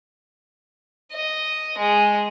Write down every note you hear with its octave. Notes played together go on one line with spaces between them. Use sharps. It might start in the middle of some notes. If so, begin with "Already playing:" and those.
D#5
G#3